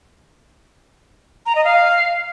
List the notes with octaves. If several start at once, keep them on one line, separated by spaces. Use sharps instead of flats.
A#5
D#5
F5